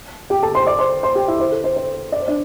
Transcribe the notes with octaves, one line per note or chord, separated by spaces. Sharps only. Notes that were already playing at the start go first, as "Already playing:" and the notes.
G4 G5
A4 A5
C5 C6
D5 D6
C5 C6
C5 C6
G4 G5
E4 E5
C5
A4
C5
C5
D5
C5
D4 D5